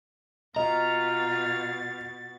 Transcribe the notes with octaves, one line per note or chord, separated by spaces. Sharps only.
B2 F4 D#5 F5 A#5 A6